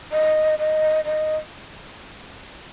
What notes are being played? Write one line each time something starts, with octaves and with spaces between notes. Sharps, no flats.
D#5
D#5
D#5